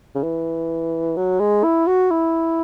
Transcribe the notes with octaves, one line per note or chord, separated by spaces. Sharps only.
C#3
E3
F#3
G#3
E4
F#4
E4